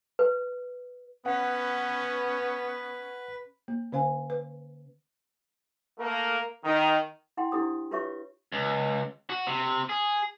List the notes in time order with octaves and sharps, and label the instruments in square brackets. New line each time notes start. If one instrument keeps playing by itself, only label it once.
[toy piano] B4
[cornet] B3 [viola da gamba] C#4 [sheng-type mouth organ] B4 [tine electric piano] F#5
[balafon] A#3
D3 C#4 C5 F5 G#5
B4
[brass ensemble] A3 A#3 A#4
D#3
[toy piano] E4 F#5 G5 C6
D4 E4 G4 C5 D#6
F4 G4 B4 C#5 E5 C#6
[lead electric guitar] C#2
F#4
C3
G#4